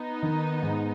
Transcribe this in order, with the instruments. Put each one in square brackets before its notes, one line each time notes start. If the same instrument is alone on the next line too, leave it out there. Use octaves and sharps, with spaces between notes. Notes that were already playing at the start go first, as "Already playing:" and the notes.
Already playing: [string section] B3 D#4
[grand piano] D#3
G#2